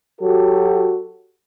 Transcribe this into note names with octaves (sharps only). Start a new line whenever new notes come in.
F#3 F#4 G4 A4